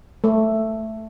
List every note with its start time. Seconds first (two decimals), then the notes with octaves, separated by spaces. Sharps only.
0.24 A3